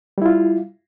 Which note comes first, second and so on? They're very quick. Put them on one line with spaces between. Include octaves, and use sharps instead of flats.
G3 E4 F4